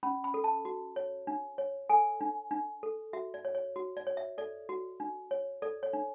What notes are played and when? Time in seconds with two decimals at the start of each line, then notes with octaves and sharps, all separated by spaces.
0.03 C#4 B5
0.24 B5
0.34 A4
0.44 A5
0.65 F#4
0.96 C#5
1.27 D4
1.58 C#5
1.89 A4 G#5
2.21 D4
2.51 D4
2.83 A4
3.13 F#4 E5
3.34 D5
3.45 C#5
3.55 C#5
3.76 F#4
3.97 D5
4.07 C#5
4.17 E5
4.38 A4 D5
4.69 F#4
5.00 D4
5.31 C#5
5.62 A4 D5
5.83 C#5
5.93 D4